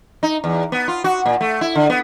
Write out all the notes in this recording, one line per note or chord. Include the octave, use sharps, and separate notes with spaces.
D#4
E2
B3
F4
F#4
A#2
A3
E4
D3
B3